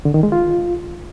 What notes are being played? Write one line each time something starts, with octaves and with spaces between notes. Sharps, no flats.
D3
D#3
G#3
F4